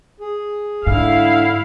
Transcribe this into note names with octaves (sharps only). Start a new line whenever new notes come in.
G#4
G#2 D3 E4 F5